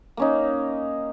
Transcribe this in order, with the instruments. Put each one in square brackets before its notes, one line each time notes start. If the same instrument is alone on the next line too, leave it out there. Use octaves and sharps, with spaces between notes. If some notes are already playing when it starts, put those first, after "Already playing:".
[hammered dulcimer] A#3 C#4 D#4